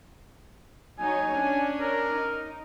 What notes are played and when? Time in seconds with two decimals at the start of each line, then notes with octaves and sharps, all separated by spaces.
0.99 F#3 D#4 C#5 G#5
1.32 C#4 D4
1.80 A#4
2.14 D#4